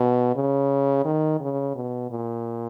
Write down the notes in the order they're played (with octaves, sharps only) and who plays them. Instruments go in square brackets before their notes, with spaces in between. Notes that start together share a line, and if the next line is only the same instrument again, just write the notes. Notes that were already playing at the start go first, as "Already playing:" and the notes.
Already playing: [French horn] B2
C#3
D#3
C#3
B2
A#2